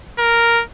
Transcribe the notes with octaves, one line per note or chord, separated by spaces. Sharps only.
A#4